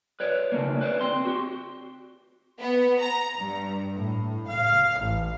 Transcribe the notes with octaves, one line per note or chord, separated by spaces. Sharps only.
B4 C#5 D5
C#3 A3 A#3
B4 C5 D5
C4 C6
F#4 G4
B3
A#5
G2
A2
F5
A1